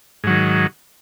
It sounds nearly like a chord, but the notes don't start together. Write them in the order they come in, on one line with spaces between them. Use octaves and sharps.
G#2 F#3 D#3